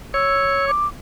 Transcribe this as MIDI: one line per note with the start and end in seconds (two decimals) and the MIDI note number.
0.14 0.71 73
0.14 0.65 88
0.68 0.87 86